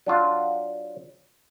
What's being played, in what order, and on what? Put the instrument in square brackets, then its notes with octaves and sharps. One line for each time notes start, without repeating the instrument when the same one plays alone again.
[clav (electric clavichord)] F#3 D4 F4